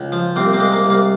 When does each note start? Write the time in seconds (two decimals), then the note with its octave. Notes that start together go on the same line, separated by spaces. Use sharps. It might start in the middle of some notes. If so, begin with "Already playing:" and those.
Already playing: C#2
0.12 F3
0.36 C2 A#3 C4
0.54 A#3 C4
0.60 G#3
0.72 A#3
0.84 C2
0.90 A#3